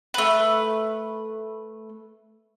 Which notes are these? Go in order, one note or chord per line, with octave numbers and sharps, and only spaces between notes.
A3 B4